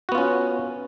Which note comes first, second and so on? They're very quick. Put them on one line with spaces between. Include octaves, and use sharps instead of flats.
F#4 B3 F4 C#4